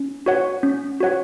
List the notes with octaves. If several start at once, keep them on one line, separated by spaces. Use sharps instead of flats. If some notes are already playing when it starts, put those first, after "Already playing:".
Already playing: C#4
F#4 C#5 F#5
C#4
F#4 C#5 F#5